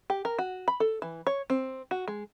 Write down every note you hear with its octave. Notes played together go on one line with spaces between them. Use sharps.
G4
A#4
F#4
B5
A4
E3
C#5
C4
F#4
G#3